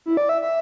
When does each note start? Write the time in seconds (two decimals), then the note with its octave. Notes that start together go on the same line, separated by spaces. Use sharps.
0.06 E4
0.17 D5
0.29 E5
0.42 E5